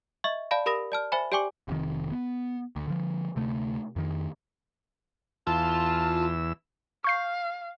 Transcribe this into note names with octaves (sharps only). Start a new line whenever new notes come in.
D#5 E5 C#6
D5 F5 A5 B5
G4 A#4 B5 D#6 A#6
D5 A5 F6
C5 E5 G#5 B5
G4 D5 G5 G#5 C#6 D6
F1 C3 D#3
B3
D2
D3 F3
D2 C3 A3
F2 D#3
E2 F4 A5 E6
F5 C#6 G6 C7